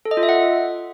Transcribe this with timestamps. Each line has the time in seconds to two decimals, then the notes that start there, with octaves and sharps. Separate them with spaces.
0.05 A4
0.11 D#5
0.17 F4
0.23 E5
0.29 F#5